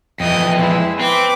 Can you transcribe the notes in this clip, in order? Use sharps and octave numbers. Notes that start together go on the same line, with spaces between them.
F2 E3 D#5
G#3 E4
C4 B4 D6